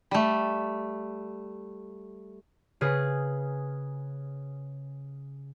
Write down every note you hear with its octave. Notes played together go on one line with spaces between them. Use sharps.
G3 A3
C#3 G#4 B4